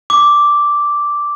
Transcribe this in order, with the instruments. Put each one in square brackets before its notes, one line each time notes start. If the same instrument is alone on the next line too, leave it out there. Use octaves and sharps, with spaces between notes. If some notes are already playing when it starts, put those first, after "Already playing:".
[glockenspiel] D6